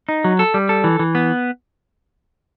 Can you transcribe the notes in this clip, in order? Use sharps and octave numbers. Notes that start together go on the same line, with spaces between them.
D#4
F#3
A4
G3
A4
E3
E3
B3